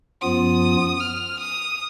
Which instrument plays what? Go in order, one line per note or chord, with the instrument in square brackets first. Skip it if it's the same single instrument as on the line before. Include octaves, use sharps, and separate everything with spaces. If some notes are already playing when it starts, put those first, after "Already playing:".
[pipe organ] F#2 F3 B3 F4 [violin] D#6
[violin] F6
D#6